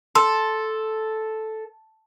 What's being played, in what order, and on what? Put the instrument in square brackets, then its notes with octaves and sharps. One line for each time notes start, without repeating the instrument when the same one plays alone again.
[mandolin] A4 [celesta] C6